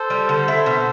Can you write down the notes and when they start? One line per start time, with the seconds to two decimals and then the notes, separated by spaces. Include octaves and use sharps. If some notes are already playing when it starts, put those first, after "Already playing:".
Already playing: A4 C5
0.10 G3
0.29 D3
0.48 E4
0.66 B2